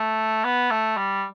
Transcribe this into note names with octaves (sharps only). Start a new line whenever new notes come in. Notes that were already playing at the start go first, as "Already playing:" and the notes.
Already playing: A3
B3
A3
G3